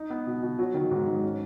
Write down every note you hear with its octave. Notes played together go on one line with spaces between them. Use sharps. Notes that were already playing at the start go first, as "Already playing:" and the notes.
Already playing: D#4
B3
B2
B2
F#3
D#3
G#2
G#2
C#4